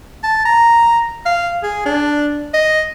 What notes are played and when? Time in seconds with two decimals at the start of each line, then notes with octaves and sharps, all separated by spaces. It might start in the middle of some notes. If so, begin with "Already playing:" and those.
0.24 A5
0.45 A#5
1.26 F5
1.63 G#4
1.86 D4
2.54 D#5